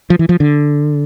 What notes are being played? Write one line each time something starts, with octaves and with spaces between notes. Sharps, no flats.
F3
E3
F3
D3